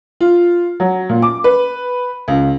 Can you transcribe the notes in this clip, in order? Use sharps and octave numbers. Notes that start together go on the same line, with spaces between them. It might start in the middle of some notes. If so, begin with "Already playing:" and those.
F4
F#3
A#2
D6
B4
C#2